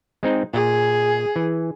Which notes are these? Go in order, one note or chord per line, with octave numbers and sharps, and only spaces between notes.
G#3 C4 D#4
A#2 G#4
E3